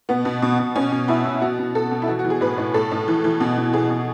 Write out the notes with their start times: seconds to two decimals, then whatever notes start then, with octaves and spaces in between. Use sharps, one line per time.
0.09 B2 B3
0.25 B2
0.42 B2
0.59 B2
0.75 B2 C#4
0.92 B2
1.08 B2 E4
1.25 B2
1.41 B2 F#4
1.59 B2
1.75 B2 A4
1.91 B2
2.02 E4
2.08 E3 F#4
2.19 F#4
2.25 E3
2.30 G#4
2.41 A2 B4
2.58 A2
2.74 A2 A4
2.91 A2
3.08 E3
3.24 E3
3.40 B2
3.58 B2
3.73 B2 G#4
3.90 B2